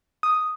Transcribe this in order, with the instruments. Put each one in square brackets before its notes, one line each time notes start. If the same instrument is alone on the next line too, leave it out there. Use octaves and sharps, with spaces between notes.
[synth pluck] D#6